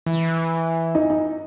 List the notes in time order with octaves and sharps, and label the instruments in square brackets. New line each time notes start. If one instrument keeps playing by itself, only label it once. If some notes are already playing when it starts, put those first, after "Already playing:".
[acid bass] E3
[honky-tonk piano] D#4
D#4